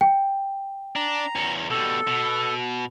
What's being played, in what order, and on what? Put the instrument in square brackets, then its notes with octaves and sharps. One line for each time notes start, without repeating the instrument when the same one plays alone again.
[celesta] G5
[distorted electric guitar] D4 [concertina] A#5
[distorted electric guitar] E2 C#4
[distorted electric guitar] B2 G3 [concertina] A4
[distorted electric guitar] B2